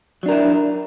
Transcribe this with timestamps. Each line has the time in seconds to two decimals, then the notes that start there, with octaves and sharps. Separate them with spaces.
0.23 F#3
0.26 D4
0.29 A#4
0.31 E4